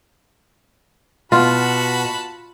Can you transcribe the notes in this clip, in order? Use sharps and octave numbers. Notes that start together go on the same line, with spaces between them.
B2 F4 F#4 A5 B5